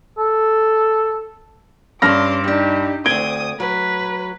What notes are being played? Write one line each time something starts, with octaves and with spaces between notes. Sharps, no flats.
A4
G2 C#4 D4 C6 D6 F6 A#6
G3 D4 D#4 G4
D2 C4 D#6 G#6 D7 G7
F#3 B4